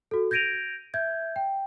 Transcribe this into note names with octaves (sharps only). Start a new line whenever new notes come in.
F#4 A4
G6 G#6 A#6 D7 D#7 F7
E5 G6 G#6
G5